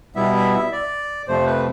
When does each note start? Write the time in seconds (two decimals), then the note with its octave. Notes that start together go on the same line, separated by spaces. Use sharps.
0.16 B2 G3 B3 E4 E5
0.34 E5
0.53 E5
0.72 D5
1.27 F2 C3 F3 A3 C5
1.46 B4